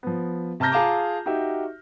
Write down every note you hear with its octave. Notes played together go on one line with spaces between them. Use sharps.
F3 B3
C3 A5 A#5 F6 G6 A#6
F4 G#4 F5 A5 A#5 D6
D#4 F#4 G4 E5